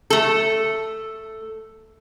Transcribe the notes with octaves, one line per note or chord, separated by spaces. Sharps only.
A3 A4